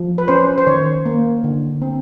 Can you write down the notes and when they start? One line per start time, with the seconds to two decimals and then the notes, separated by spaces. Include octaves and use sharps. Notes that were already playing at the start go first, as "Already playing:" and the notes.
Already playing: F3
0.18 B4
0.28 C#4 C5
0.58 C5
0.67 D#3 C#5
1.06 A#3
1.44 D3
1.82 C4